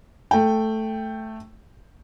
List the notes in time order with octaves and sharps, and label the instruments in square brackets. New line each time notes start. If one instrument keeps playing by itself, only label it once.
[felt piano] A3 G5